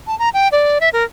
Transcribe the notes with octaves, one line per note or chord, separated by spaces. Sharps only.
A5
A#5
G5
D5
E5
A#4